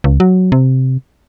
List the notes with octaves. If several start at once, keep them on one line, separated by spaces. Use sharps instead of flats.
C#2
F#3
C3